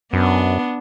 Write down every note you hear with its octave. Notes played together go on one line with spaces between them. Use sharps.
F#2 B3 D4